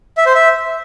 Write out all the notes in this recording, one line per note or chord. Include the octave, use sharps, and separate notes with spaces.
E5
C5
E5